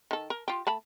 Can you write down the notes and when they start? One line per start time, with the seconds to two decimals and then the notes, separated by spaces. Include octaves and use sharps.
0.11 D#3 A4
0.30 A#4
0.48 F4 G4
0.67 A3 A5 B5